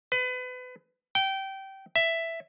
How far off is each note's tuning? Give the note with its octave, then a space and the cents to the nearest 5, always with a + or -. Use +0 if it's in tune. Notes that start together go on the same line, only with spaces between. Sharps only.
B4 +30
G5 -20
E5 +5